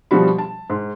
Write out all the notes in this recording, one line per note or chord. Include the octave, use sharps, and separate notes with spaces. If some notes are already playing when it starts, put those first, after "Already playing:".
B2 F3 G3 F#4 B5
A5
G#2